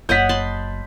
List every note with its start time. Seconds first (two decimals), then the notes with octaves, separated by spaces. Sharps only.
0.09 F#1 C#5 D#5 F#5 G6 B6
0.29 A5 B5 C6